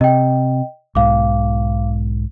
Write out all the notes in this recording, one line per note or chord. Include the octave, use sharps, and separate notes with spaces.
C3 D#5 G5
B1 G#2 F5 D6